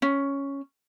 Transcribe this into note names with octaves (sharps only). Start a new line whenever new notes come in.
C#4